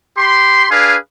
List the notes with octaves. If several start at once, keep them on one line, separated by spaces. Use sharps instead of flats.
G4 B5 C6
D4 G#4 B4 F5 G#5